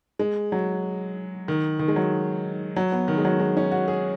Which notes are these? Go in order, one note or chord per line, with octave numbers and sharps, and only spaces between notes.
G#3
F#3
D#3
D#3
G#3
F#3
F#3
B3
D#3
G#3
F#3
G#3
C#4
F#4
G#4